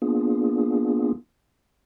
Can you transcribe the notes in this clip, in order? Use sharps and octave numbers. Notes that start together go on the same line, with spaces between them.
A#3 B3 D4 F4 G#4